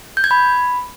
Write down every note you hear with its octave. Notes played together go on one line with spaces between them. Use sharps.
G6
G#6
B5